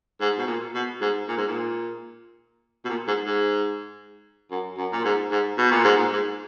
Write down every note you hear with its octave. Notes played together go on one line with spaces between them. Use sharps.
G#2
B2
A#2
B2
G#2
A#2
G#2
A#2
B2
A#2
G#2
G#2
F#2
F#2
A#2
G#2
G#2
B2
A#2
G#2
A#2
G#2